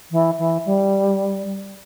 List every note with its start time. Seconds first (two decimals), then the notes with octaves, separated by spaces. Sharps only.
0.11 E3
0.38 E3
0.65 G3